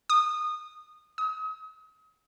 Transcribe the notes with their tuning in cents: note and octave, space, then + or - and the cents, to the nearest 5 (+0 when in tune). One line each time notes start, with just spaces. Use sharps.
D#6 -20
D#6 +35